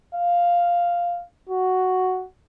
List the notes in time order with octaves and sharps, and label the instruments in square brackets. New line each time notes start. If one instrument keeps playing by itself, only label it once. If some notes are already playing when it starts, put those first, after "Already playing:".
[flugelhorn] F5
F#4